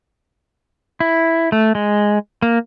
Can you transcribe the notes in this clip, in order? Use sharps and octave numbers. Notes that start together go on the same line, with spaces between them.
E4
A3
G#3
A#3